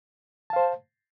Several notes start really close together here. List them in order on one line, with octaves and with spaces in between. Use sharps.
A5 F5 C5